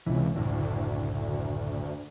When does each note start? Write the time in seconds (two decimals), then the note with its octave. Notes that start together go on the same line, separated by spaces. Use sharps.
0.06 C#2 C3 E3
0.35 F#1 D2 A2